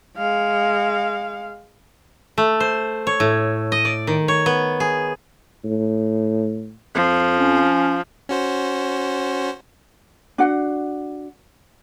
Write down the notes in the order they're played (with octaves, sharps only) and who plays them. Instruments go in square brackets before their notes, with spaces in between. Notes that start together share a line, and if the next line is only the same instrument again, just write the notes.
[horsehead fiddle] G#3 F5
[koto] A3
C5
C#5
A2
D#5
D5
D#3
C#5
B3
G#4
[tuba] A2
[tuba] F2 [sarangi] F3
[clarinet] C#4
[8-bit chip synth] C#4 F#4 C5
[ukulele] D4 F#4 F#5